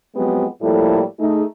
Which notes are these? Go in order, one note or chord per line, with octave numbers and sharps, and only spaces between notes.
F3 F#3 G#3 B3 C4 G4
A2 F3 G3 A#3 E4 A4
A3 D#4 G#4